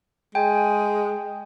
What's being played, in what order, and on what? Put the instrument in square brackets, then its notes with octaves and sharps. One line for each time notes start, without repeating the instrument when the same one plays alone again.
[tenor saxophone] G#3 [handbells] G5 G#5